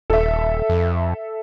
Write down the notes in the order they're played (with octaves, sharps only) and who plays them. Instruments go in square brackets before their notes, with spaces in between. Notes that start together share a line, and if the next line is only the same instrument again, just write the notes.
[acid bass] D#1 [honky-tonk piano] A4 E5
[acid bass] F2